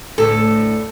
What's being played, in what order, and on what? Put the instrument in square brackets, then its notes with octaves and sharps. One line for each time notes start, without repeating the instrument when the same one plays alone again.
[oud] D2 A2 [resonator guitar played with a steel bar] A4